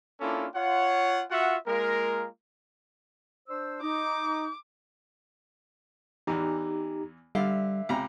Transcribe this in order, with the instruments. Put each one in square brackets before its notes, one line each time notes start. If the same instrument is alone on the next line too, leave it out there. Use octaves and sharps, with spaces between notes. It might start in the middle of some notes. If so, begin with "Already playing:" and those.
[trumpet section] A#3 C#4 D4 E4 F4 A4
F4 C#5 F#5
F4 F#4 E5 F#5
G#3 A#3 F4 A#4
[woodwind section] D4 C5 E6
[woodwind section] D#4 [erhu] D6
[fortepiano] E2 E3 [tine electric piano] D#4 G4 A#5
[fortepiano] D3 F5 [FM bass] G3 [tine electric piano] E5
[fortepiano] C#2 C3 A#5